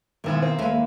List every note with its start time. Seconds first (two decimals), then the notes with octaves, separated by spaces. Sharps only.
0.24 B1 G#2 D#3 B3 E4 A#4
0.42 A#3 C4
0.58 D#2 G#3 A3 B4 E5 F5
0.71 A#3